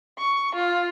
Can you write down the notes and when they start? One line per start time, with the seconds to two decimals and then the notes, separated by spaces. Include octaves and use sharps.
0.18 C#6
0.55 F4